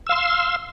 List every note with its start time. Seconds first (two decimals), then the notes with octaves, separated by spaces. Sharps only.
0.07 E6
0.09 F5
0.12 C6